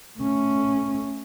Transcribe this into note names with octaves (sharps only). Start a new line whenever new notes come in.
A3 C#4